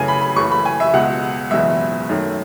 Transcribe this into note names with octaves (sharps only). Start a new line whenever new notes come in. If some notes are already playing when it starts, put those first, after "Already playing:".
Already playing: F#2 C#3 E3 A3 G#5
B5
B5
F#1 F#2 E3 A3 C#6
B5
G#5
E5
C#2 B2 G#3 F#5
F#1 E2 B2 G#3 E5
F#2 D#3 A3